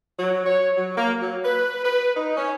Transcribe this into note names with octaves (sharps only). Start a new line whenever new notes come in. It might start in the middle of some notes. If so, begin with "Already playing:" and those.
F#3
C#5
F#3
A#3
F#3
B4
B4
D#4
C#4